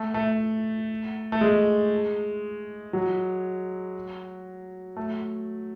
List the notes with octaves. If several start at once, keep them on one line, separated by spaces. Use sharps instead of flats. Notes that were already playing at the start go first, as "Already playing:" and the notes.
Already playing: A3
A3
A3
G#3
F#3
A3